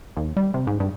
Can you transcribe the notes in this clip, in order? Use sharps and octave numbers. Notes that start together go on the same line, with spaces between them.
D#2
G3
C3
G#2
G2